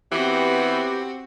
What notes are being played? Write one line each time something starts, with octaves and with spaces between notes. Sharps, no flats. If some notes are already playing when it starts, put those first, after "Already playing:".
E3 B3 C4 F#4 G4